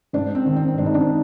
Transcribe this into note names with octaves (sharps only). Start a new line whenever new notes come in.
G#2 D4
C4
D#3
C4
G#2 D4
D#4
D4